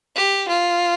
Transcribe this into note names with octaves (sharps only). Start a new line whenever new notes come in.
G4
F4